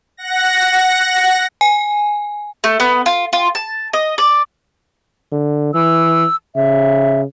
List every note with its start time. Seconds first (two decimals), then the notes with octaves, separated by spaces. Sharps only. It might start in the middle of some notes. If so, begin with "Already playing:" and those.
0.17 F#5 A#6
1.61 G#5
2.64 A3
2.80 B3
3.06 F4
3.33 F4
3.55 A5
3.93 D#5
4.18 D5
5.32 D3
5.74 E3 E6
6.55 C#3 E5